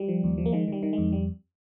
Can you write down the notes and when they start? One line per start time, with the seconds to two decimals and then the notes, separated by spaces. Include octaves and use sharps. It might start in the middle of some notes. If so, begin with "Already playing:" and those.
Already playing: G3
0.08 F3
0.24 D#2
0.38 F3
0.46 A#3
0.53 D#3 G#3
0.68 D#3 G3
0.83 D#3
0.93 F2 G#3
1.12 G3